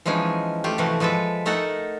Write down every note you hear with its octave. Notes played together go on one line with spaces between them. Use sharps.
E3 F3 G#3 C#4 D#4
A3 F4 G4
C3 E3 F3 A3 F#4
F3 G#3 A4 B4 E5
A3 D#4 A4 A#4 F#5